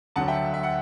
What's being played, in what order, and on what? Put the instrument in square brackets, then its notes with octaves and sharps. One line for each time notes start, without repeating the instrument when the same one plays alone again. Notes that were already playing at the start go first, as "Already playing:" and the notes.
[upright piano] D2 D3 F#3 F#5 A5
E5 G5
E5
F#5